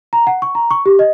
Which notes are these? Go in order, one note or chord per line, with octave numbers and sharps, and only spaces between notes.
A#5
F#5
C#6
A#5
C#6
G4
D#5